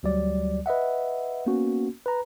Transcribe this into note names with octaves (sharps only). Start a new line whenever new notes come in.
D2 F#3 G3 D5
B4 D#5 E5 F#5
A#3 B3 C#4 F#4
B4 A#5